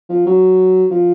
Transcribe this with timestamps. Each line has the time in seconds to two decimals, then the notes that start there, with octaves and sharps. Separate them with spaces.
0.09 F3
0.26 F#3
0.91 F3